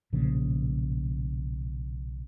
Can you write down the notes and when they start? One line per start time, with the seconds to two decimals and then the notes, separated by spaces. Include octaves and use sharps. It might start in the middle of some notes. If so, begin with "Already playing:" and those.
0.12 B1 A#2 C#3 F3